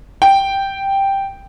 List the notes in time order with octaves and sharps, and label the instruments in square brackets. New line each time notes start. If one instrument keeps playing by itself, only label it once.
[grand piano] G5